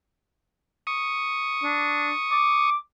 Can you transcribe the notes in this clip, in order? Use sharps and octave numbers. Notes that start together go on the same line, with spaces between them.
C#6 D#6
D4
D6